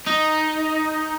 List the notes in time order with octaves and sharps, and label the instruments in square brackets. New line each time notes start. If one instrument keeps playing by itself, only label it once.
[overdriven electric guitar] D#4